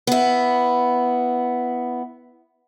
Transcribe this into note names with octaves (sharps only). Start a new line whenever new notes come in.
B3 E4